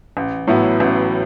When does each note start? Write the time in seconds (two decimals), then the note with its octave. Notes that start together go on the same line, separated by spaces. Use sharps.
0.17 A1
0.47 A2 F#3 B3 E4
0.80 A1